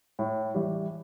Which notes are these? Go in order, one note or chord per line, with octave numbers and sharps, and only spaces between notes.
A2
E3 G3